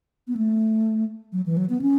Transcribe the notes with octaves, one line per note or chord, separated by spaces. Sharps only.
B3
A3
F#3
E3
F#3
B3
C#4